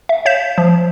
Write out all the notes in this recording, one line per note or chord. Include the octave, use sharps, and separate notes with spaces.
E5
C#5 F5 G6 B6 E7
F3